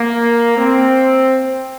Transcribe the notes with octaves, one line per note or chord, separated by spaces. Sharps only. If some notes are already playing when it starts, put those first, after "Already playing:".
Already playing: A#3
C4